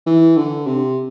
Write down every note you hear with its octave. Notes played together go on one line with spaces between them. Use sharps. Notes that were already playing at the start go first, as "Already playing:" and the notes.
E3
D3
C3